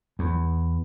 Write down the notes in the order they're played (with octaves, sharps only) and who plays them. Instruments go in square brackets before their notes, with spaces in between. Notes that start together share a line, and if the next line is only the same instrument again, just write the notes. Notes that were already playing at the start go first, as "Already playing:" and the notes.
[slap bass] E2